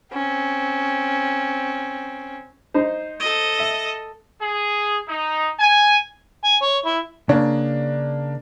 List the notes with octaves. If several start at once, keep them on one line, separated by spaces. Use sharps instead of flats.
C4 C#4
D#4 C5
A4 D#5
E5
G#4
D#4
G#5
G#5
C#5
E4
C#3 A#3 D4